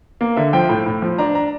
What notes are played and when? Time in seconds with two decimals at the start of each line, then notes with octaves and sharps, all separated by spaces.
0.21 A#3
0.37 D3 E5
0.53 F3 G5
0.69 A2
0.86 A2
1.02 F3
1.18 D4 A#5
1.35 A#5